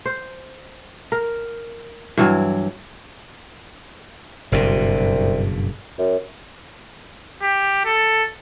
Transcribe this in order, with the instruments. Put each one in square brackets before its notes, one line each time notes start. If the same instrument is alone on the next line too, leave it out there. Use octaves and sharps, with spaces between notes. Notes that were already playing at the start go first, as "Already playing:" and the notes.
[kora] C5
A#4
G2 E3 F#3
[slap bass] F#1 G2 B2 [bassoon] C2
[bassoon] F#2
[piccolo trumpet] G4
A4